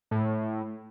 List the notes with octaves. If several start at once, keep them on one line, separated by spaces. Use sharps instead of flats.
A2